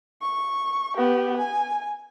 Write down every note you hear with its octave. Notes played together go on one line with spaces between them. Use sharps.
C#6
B3 G4
G#5